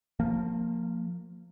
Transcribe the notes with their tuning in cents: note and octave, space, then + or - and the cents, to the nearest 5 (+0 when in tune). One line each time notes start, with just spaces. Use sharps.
F3 +10 A#3 -20